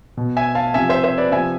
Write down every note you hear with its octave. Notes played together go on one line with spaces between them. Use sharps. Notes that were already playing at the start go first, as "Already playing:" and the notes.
B2
E5 G#5
F5 A5
C3 F3 E5 G#5
C5 E5
C5 E5
B4 D5
C3 F3 E5 G#5